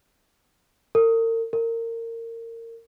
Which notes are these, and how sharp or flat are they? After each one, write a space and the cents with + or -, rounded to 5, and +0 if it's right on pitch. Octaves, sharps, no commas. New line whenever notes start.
A#4 -40
A#4 -25